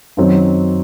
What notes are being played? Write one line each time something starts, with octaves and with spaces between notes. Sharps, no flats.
F#2 D#3 F#3 C4